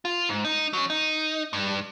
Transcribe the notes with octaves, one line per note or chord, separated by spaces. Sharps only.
F4
G#2
D#4
F#3 C#4
D#4
G2